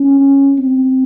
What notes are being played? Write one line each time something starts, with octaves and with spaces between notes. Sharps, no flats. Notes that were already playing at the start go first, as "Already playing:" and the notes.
Already playing: C#4
C4